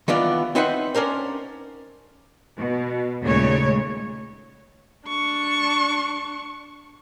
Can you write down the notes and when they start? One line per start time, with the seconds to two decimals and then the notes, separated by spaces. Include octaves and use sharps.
0.08 D#3 E3 B3 D4 F4 D5
0.55 C4 D#4 B4 C5 E5 F#5
0.95 C#4 D4 A#4 C5
2.58 B2
3.24 D#2 A#2 C#3 G#3 A3 C#5
5.08 D4 C#6